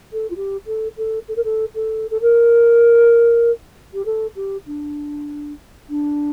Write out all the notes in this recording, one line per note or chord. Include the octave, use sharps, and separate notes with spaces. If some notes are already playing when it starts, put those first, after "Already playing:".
A4
F4
G4
A4
A4
A4
A#4
A4
A4
A4
A#4
G4
A4
G4
D4
D4